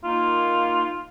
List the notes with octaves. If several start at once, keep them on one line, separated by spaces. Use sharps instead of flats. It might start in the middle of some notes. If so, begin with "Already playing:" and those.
A#3 D#4 F4